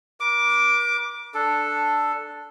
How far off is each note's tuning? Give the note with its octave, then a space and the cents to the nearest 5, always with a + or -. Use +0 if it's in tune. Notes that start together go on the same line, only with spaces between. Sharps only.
A#4 +45 D6 +0
D4 +0 A4 +0